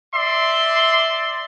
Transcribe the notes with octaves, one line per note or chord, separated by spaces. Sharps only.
D5 E5 C6